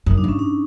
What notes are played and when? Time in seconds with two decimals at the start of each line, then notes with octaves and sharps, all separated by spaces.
0.06 F#2 D#4
0.18 D4
0.24 G2 C#4
0.39 D4